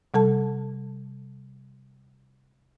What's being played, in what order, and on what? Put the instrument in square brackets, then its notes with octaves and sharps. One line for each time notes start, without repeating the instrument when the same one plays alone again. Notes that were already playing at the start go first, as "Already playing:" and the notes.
[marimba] C3 G3 A4 A5